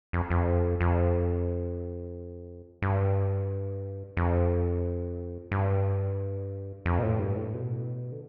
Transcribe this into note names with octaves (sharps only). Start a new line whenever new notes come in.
F2
F2
F2
G2
F2
G2
F2
B2
A2
G2
A2
B2
D3